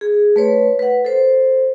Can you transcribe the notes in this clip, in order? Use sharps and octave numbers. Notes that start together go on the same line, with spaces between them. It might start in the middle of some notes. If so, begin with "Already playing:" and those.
G#4
A3 B4 C#5
B4 F#5
A4 C5